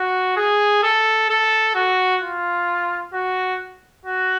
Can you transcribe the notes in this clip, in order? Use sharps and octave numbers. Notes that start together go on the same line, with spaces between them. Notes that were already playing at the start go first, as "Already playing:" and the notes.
Already playing: F#4
G#4
A4
A4
F#4
F4
F#4
F#4